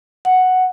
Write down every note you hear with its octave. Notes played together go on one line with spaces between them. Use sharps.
F#5